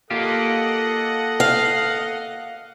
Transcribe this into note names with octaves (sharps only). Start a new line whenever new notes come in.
A#3 F4 G4 A4 D#5 F#5
F5